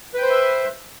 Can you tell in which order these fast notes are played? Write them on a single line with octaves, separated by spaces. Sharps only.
B4 G5 C5 C6 E5